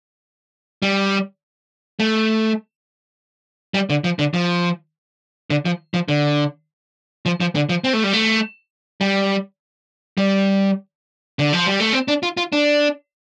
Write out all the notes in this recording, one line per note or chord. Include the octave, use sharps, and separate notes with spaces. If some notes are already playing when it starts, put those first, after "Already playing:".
G3
A3
G3
D3
F3
D3
F3
D3
F3
F3
D3
F3
F3
D3
F3
C4
A3
G3
A3
G3
G3
D3
F3
G3
A3
C4
D4
F4
F4
D4